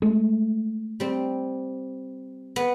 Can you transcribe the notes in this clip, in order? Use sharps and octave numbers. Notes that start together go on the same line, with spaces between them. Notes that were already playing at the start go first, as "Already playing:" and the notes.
G#3 A3
G3 C4
B3